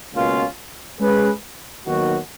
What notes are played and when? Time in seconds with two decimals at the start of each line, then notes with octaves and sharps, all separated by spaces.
0.13 C#2 B2 A#3 C#4 F4
1.00 G#3 C#4 G#4 B4
1.86 D#2 D#3 F#3 B3 F#4